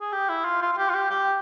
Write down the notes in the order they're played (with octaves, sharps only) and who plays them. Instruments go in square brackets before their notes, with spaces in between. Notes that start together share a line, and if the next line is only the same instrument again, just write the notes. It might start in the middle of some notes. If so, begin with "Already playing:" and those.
[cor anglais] G#4
G4
E4
F4
F4
F4
G4
F4
G4
G4